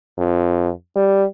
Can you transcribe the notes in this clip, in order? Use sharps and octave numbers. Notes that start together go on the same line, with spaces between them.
F2
G3